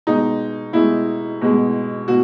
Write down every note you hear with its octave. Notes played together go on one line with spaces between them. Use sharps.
B2 G#3 D#4
B2 G#3 E4
B2 G#3
B2 F#4